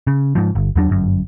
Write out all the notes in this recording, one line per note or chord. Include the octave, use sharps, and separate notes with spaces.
C#3
G#2 F3
G1
E2 F#3 D4
G1 F#2